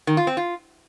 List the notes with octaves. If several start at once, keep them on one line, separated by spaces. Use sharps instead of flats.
D#3
F4
C4
F4